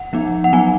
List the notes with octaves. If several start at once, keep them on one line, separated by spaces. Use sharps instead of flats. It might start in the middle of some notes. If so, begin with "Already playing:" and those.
Already playing: F#5
F3 B3 D#4
F#5
F#3 B3 D#4 G#5